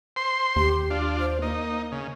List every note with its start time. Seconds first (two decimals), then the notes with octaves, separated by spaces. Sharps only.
0.16 C5 C6
0.56 D#2 G4
0.90 D4 F4
1.19 C5
1.42 A#3 D#4
1.92 C#3